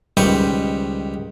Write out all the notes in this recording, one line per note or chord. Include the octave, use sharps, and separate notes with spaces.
C#2 D#3 G3 B4 C5 C#6